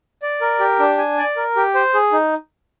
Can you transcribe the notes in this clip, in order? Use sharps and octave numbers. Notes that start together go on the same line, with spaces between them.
D5
A#4
G4
D4
G#5
D5
A#4
G4
C5
G#4
D#4